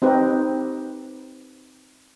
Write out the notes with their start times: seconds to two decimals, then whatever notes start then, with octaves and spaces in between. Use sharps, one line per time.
0.02 C4 D#4 G4 B4